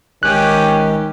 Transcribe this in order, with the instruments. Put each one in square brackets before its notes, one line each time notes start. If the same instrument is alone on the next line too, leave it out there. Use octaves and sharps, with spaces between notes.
[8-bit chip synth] A1 G#3 G5 [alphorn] D#3 [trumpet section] C#4 G4 [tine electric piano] F#6